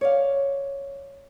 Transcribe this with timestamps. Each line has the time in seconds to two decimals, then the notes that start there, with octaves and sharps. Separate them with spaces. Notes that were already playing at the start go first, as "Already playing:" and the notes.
0.01 C#5 D5 F5